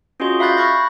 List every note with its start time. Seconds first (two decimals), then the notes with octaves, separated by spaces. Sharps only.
0.20 C#4 F4 F#4 G#4 D#5 C6
0.39 E5 F5 B5 F#6 G6 A6
0.57 B5 C#6 F6 F#6 A6 A#6